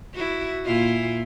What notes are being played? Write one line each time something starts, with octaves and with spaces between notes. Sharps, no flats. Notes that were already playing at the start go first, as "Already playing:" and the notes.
E4 F#4
A#2 E4 F4